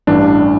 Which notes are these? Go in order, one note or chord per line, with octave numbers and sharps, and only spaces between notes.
A1 G2 E3 D4